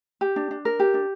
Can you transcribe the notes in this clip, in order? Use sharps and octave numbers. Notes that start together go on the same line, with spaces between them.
G4
D4
D4
A#4
G4
D4